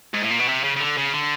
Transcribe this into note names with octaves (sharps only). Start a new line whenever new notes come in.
G#2
A2
A#2
B2
C3
C#3
C#3
D3
C#3
D3